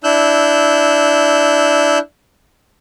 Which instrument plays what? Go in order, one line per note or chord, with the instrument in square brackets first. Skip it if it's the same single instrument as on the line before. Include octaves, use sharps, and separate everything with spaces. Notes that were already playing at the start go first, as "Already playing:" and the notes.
[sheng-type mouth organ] D4 E4 E6 F#6 G6